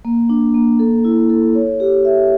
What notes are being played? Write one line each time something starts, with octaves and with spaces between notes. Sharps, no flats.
A#3
D4
A#3
A4
E4
A4
C#5
G4
E5